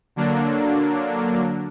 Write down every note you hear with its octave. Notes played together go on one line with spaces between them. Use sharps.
D3 F#3 A#3 D4